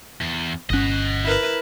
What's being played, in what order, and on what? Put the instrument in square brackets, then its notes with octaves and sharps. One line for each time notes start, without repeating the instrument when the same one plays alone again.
[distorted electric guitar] E2
[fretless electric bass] G1 C#4 [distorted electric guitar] D#5 F#5
[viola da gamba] E4 A#4 B4